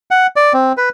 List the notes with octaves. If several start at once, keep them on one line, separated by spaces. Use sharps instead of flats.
F#5
D5
C4
B4